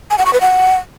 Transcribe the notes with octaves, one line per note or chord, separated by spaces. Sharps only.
G#5
F#5
C#6
B4
F#5